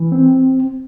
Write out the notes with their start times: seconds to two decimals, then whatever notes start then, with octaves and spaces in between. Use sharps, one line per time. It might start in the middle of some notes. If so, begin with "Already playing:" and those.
Already playing: E3
0.12 C4